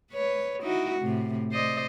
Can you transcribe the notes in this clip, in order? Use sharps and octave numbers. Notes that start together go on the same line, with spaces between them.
B4 C#5
D#4 E4 F#4
A2 C3
C5 D5 D#5